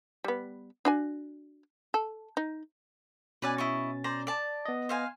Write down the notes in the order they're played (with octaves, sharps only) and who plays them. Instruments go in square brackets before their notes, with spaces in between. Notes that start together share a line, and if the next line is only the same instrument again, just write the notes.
[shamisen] G3 B3
D4 F#4 G#5
A4
D#4
[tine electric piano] B2 C#4 A6 [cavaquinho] B4 D5 G#5
[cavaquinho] E4 D#5 C#6
C5 D5 A#5
D5 A5
[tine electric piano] B3 D#5
[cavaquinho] C5 F5 G#5